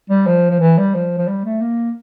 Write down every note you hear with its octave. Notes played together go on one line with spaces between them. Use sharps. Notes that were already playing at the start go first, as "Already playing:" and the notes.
G3
F3
F3
E3
G3
F3
F3
G3
A3
A#3